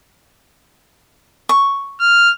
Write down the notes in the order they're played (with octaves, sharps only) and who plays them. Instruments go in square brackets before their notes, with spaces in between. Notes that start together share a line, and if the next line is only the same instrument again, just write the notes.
[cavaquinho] C#6
[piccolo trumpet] F6